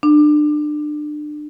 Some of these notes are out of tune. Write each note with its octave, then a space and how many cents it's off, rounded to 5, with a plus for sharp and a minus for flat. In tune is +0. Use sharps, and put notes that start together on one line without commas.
D4 +30